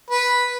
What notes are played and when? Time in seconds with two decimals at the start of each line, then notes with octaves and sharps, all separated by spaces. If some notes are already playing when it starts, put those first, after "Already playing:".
0.10 B4